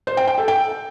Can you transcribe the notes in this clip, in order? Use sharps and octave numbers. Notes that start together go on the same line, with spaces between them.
C5
G5
G5
A4
G5